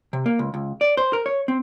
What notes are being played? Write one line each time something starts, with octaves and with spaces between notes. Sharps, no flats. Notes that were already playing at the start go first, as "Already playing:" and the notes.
C3
A#3
C#2
C#2
D5
C5
A#4
C#5
C4